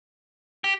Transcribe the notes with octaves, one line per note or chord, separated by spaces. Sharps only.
G4